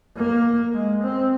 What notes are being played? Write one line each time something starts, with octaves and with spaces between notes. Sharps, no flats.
A#3
G#3
C4